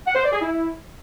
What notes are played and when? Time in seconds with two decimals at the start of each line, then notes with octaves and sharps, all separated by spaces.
0.06 F#5
0.15 C5
0.24 D5
0.32 G#4
0.41 E4